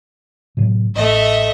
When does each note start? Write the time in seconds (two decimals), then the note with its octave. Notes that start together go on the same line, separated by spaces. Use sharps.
0.57 A2 C3 F#3
0.96 A1 A3 D#5 E5